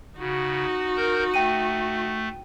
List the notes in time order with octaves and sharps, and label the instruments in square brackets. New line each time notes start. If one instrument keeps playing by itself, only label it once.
[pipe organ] C#3 [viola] D#4 F#4
[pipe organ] A#4 G6
[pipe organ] A3 [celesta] G5 D#7